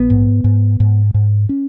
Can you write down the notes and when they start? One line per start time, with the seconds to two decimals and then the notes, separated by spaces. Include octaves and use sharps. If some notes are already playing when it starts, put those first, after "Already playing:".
Already playing: A#1 B3
0.10 G#2
0.44 G#2
0.80 G#2
1.14 G#2
1.49 C#4